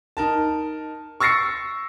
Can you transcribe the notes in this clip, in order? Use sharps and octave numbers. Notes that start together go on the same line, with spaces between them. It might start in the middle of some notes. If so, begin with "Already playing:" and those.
D#4 A#4 A5
C#6 E6 A6 A#6 C7 C#7